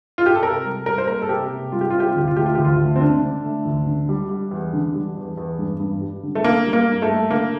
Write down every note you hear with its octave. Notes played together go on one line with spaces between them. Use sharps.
F4
G4
A4
C3 A#4
G3
G3 A#4
C5
A#3 A#4
A4
C3 G4
C3
G3 F4
G4
C3 F4
G4
F4
D2 G4
F4
A3 G4
F4
D2 G4
F4
A3
C4
D3 D4
D3
A3
D2
D3
G3
G3
E2
D3
G3
E2
E2
G2
G2
G3
D3
A3
D3 A#3
G3
A#3
G2
A3
G3
D3 A#3